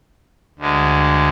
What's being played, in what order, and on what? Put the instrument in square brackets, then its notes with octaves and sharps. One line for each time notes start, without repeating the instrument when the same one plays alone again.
[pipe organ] D2 D3 G#3